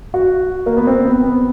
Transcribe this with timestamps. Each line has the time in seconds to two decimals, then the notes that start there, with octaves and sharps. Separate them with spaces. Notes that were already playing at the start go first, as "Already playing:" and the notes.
0.14 F#4
0.66 A#3
0.77 B3
0.87 C4
1.05 B3
1.24 B3